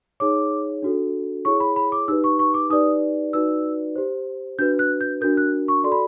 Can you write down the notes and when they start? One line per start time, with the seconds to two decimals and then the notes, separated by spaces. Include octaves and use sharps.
0.20 D#4 G#4 C#5 D6
0.82 D4 F#4 A4
1.45 E4 G#4 C#5 C#6
1.60 B5
1.76 B5
1.92 D6
2.08 D#4 G4 B4 E6
2.24 C#6
2.39 C#6
2.54 D6
2.70 D#4 G4 B4 D5 D#6
3.33 D#4 F#4 B4 D5 E6
3.96 G4 C5
4.59 D4 F#4 B4 G6
4.79 F#6
5.01 G6
5.21 D4 F#4 A#4 G6
5.37 F#6
5.68 C#6
5.84 F#4 A4 D5 C6
5.92 B5